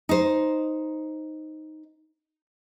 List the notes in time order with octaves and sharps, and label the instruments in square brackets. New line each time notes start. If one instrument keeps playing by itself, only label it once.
[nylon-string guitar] D#4 C5